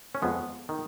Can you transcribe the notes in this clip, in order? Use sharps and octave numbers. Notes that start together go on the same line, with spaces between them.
C#4
F2 G#3 B3
D#3